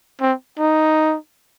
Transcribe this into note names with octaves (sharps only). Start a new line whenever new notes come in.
C4
D#4